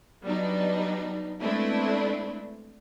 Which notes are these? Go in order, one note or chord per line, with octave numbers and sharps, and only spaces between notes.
F#3 G3 B3 D4 D#4
G#3 A3 B3 C4 D4 E4